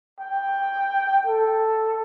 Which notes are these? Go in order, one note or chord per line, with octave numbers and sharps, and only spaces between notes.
G5
A4